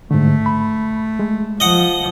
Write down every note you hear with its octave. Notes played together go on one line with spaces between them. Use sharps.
G#2 D3 A3
B5
G#3
F3 D#5 F#5